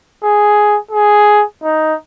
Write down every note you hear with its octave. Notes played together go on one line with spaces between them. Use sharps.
G#4
G#4
D#4